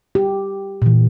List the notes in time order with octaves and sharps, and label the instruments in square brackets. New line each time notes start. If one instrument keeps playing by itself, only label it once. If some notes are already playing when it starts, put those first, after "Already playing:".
[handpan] G4
A#2 E3